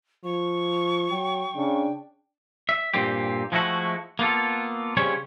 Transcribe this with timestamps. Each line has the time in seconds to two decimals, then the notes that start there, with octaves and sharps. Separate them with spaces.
0.24 F3 C#6
1.11 F#3 G5
1.56 C#3 D4
2.69 E5
2.94 G2 A#2 C4 G4
3.52 F3 G#3 A3 E4 F#4
4.19 A#3 B3 F4 A4
4.97 C#3 G3 C4 C#4 C#5